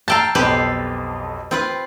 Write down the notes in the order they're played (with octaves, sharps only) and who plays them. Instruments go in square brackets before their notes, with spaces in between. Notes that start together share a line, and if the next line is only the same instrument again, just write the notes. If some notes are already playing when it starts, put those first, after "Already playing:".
[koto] F5 G5 A5 [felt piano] A#5 E6 A6
[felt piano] B1 F2 [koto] G4 B4 C5
[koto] C4 F4 B4